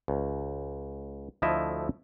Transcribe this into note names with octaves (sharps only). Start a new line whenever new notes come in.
C#2
D2 F3 A3 E4 D#5 E5